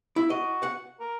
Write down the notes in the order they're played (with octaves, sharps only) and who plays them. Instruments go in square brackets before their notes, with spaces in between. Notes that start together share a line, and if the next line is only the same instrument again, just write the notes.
[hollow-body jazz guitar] E4
[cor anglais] F#4 [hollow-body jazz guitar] D#5
[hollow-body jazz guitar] F#5
[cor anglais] A#4